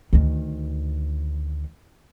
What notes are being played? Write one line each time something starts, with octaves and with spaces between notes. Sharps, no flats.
D2 D#3